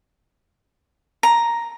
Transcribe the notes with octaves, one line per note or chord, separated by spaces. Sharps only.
A#5